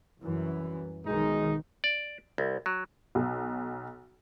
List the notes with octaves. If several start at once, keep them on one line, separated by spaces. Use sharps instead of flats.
C2 F#2 E3
B1 D#3 G#3 D#4
D5
C2
F#3
B1